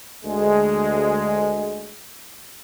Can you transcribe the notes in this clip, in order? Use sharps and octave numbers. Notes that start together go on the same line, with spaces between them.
D2 G#3